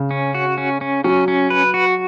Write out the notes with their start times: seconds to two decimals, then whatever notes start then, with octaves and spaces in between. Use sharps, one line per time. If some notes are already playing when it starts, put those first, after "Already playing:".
Already playing: C#3
0.11 C#4
0.35 F#4
0.58 C#4
0.81 C#4
1.04 F#3 C#4
1.28 C#4
1.50 B4
1.74 F#4